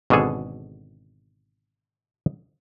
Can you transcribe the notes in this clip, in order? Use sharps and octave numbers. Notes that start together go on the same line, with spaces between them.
G#1 B2 D3 D4 G#4 A4